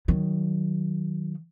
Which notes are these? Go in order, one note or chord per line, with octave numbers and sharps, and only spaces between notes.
D#3 F#3